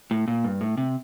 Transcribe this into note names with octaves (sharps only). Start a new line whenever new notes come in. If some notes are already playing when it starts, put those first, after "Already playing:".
A2
A#2
G2
A2
C3